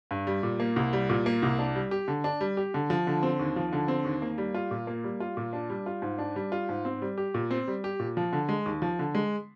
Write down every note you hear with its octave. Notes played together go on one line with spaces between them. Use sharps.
G2
G3
A#2
A#3
C2
G3
A#2
A#3
C2
D4
G3
G4
D3
D4
G3
G4
D3
F3
D3
C4
D#2
F3
D3
C4
D#2
A#3
G3
F4
A#2
A#3
G3
F4
A#2
D4
G3
F4
G#2
D4
G3
F4
G#2
C4
G3
G4
A#2
C4
G3
G4
A#2
F3
D3
G#3
D#2
F3
D3
G#3